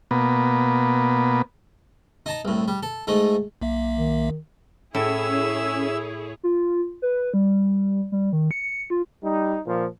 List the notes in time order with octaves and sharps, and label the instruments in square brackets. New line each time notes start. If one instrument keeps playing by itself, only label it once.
[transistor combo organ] B2 A#3 B3
[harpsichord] D#4 A5 A#5
C2 A2
G3
A4
G#2 A3 D#4
[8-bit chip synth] B1 A#3 E5
[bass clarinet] D#3
[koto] A2 [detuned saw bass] C#4 [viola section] E4 G#4 C#5 [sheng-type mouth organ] E5 E6
[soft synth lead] F4
B4
G3
G3
D#3
C#7
F4
[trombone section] G3 D#4
A#2 F3